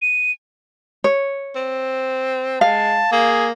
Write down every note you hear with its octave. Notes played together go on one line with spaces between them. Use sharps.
D#7
C#5
C4
G#3 F5 A5
A#3 G#4